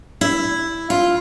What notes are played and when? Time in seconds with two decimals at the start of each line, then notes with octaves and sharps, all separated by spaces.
0.21 E4
0.90 F4